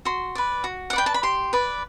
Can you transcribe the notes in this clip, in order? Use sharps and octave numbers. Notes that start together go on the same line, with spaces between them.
F#4 C6
B4 D5
F#4
F#5
B4 D5 G5
A5
B5
G4 C6
B4 D5